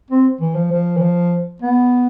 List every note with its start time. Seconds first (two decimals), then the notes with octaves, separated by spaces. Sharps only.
0.11 C4
0.41 E3
0.55 F3
0.71 F3
0.97 E3
1.02 F3
1.62 B3